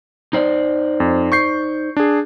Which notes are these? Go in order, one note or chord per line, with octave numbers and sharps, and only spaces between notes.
D#4 C5 D5
F2
C#6 G6 C7
D4 G#4